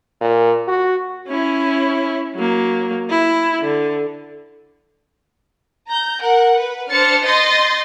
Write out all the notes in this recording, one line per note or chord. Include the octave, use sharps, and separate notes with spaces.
A#2
F#4
C#4 E4
F#3 A#3
E4
D3
A#5 G6
A#4 F#5
B4
D4 C5 F6 A6 C#7
D#5 C6 G6 A6 A#6